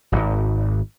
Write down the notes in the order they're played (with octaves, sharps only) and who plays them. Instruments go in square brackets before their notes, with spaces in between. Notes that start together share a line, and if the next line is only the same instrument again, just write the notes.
[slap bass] D1 G#1